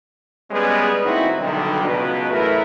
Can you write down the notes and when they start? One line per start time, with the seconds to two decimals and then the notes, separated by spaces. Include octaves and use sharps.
0.50 G3 G#3 B3 C#4 G#4 B4
1.03 D#2 A2 C4 D#4 E4 F#4
1.39 B1 D3 D#3 F#3 G3
1.85 C#2 B2 F#3 B4
2.30 A1 A3 E4 G#4 A#4 B4